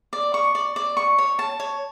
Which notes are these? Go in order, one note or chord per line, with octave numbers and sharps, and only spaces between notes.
D5
C#6
D5
D5
C#6
C#5
A5
C#5